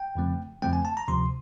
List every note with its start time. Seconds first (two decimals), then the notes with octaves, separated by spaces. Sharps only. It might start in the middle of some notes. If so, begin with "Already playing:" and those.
Already playing: G5
0.15 F2 C#3 F3 A3 C4
0.62 F2 C#3 F3 A3 C4 G5
0.73 G#5
0.85 A5
0.97 A#5
1.08 D2 C3 F3 C6